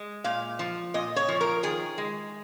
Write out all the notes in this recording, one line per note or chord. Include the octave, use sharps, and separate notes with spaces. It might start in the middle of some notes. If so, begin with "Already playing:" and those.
Already playing: G#3
A#2 F5
F3
A#2 D#5
C#5
F3
A#4
D#3 G#4
G#3